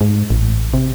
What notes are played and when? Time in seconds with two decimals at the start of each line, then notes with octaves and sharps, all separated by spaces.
0.01 G#2
0.30 A1
0.74 C3